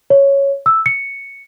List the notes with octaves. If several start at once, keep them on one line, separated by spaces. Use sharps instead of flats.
C#5
E6
C#7